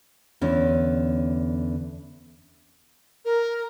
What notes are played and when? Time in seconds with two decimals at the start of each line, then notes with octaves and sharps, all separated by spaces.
0.41 E2 D3 C#4
3.25 A#4